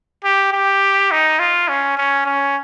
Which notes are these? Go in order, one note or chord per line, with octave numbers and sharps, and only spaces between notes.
G4
G4
D#4
F4
C#4
C#4
C#4